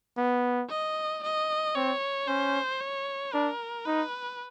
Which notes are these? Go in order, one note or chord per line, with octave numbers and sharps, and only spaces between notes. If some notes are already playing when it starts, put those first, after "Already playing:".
B3
D#5
D#5
C4 C#5
C#4 C5
C#5
D4 A#4
D#4 B4